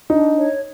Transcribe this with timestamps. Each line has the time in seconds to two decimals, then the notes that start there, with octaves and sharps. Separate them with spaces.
0.09 D4 D#4
0.37 C#5